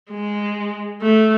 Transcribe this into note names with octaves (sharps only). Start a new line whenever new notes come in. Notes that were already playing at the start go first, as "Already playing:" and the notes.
G#3
A3